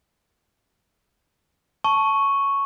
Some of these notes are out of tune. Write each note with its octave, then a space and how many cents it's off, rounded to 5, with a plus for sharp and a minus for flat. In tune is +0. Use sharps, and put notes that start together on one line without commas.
A5 +0 C#6 +0